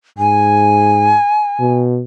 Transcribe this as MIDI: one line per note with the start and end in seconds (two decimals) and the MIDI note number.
0.18 1.18 44
0.18 1.76 80
1.60 2.03 47